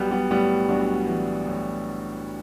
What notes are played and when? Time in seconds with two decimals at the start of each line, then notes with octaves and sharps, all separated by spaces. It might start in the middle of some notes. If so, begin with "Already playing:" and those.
Already playing: B1 G3 B3
0.11 G3 B3
0.31 A2 G3 B3
0.69 B1 D4 F#4
1.07 E3
1.47 A2